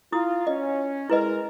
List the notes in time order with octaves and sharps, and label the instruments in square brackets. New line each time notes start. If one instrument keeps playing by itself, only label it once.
[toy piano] E4 D#6 [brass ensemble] F4
[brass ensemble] C#4 [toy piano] D#5
[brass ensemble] G#3 A#4 [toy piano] E4 B4 D#5